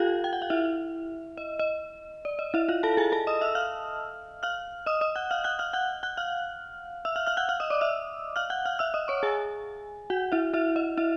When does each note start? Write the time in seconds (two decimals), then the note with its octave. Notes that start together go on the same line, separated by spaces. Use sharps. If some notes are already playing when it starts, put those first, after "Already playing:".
Already playing: F4 G4 A4 F5 G5
0.24 G5
0.33 F#5
0.42 F5
0.50 E4 E5
1.37 D#5
1.59 D#5
2.25 D5
2.39 D#5
2.54 E4 E5
2.69 F4 F5
2.83 A4 A5
2.97 G#4 G#5
3.12 A4 A5
3.27 D#5 D#6
3.41 E5 E6
3.55 F5 F6
4.43 F5 F6
4.86 D#5 D#6
5.01 D#5 D#6
5.16 F#5 F#6
5.31 F5 F6
5.44 F#5 F#6
5.59 F5 F6
5.73 F#5 F#6
6.03 F#5 F#6
6.17 F5 F6
7.05 E5 E6
7.16 F5 F6
7.27 F5 F6
7.37 F#5 F#6
7.49 F5 F6
7.60 D#5 D#6
7.70 D5 D6
7.81 E5 E6
8.36 F5 F6
8.50 F#5 F#6
8.65 F5 F6
8.79 E5 E6
8.94 D#5 D#6
9.08 C#5 C#6
9.23 G#4 G#5
10.10 F#4 F#5
10.32 E4 E5
10.54 E4 E5
10.76 D#5
10.97 E4 E5